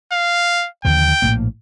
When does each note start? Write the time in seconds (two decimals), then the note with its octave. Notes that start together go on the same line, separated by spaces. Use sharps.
0.12 F5
0.85 D#2 D3 F3 G5
1.22 A#1 A2 A#3